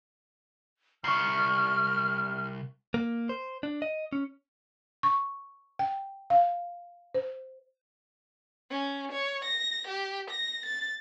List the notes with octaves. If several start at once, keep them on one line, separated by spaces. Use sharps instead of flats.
C2 C#6 F6 C7
A#3
C5
D4
D#5
C#4
C#6
G5
F5
C5
C#4
C#5
A#6
G4
A#6
A6